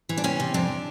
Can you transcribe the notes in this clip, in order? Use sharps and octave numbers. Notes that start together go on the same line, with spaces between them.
E3
D4
C3 C#4
C3
F2 D4